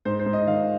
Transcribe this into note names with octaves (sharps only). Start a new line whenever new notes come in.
G#2 C5
C5
G#2
D#5
D#3 F5